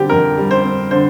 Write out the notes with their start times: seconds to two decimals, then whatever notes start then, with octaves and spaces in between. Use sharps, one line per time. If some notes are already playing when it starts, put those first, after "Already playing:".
Already playing: D3 G3 C4 G4
0.09 F2 A#4
0.38 G3
0.51 C5
0.64 C4
0.91 D3 C5